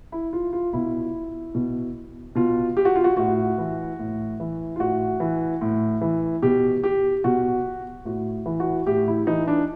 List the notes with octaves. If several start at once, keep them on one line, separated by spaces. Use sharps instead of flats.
E4
F4
F4
B2 E4
B2
B2 F4
G4
F#4
F4
F#4
A2 F#4
E3
A2
E3
F4
A2 F#4
E3
A2
E3
B2 G4
G4
B2 F#4
A2 F#4
E3
F#4
A2 G4
E4
E3 D#4
D4